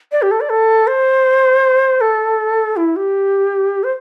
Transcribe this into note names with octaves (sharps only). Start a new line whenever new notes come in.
D5
G4
A4
D5
A4
C5
A4
E4
G4
C5